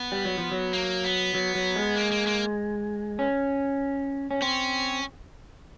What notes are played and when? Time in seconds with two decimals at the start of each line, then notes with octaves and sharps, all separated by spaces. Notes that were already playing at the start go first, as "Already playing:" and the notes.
Already playing: B3
0.12 G3
0.25 F#3
0.38 F3
0.52 F#3
0.73 A#3
1.04 B3
1.34 F#3
1.55 F#3
1.76 G#3
1.96 A#3
2.11 A#3
2.27 A#3
3.19 C#4
4.31 C#4
4.42 C4 C#4